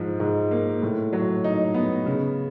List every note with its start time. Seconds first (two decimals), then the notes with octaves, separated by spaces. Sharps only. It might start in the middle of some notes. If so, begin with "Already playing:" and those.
Already playing: G#2 F3
0.20 G#2
0.51 A#3
0.82 A2
1.13 F#3
1.44 D#4
1.74 B3
2.06 C#3